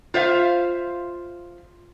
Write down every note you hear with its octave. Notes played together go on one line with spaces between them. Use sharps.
F4 C5 E5 F5